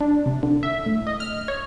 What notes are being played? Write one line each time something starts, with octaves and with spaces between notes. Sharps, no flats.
D4
C3
D3
E5
A2
D#5
F6
C#5